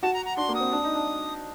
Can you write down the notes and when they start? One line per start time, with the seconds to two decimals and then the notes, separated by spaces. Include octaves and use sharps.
0.02 F#4 A5
0.14 A#5
0.25 A#5
0.37 D4 C6
0.49 A#3
0.55 D#6
0.60 C4
0.72 D4
0.84 D#4
0.95 D4